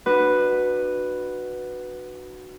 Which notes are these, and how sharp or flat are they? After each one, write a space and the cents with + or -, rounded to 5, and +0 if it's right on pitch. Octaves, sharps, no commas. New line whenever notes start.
D4 +40 F#4 +0 B4 +0